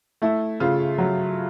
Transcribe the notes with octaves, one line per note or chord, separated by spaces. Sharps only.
A3 E4
C#3 F4
F#3